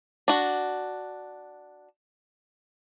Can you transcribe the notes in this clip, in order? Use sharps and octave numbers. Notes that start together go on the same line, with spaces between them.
D4 F#4